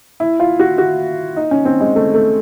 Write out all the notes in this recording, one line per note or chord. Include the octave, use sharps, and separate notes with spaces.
E4
F4
F#4
F#4
D#4
C#4
C4
G#3
A3
A3